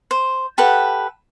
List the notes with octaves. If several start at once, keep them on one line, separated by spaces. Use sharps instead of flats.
C5
G4 A4 B4 F#5